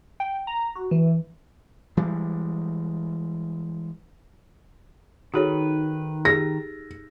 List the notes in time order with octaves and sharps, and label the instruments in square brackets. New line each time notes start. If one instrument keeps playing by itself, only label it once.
[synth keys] G5
A#5
F#4
E3
[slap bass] E3 G3 G#3
[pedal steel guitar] D#3 B4 [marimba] D#4 A4 [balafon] F#4 G#4 C#5
[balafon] G4 G#4 [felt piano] A#6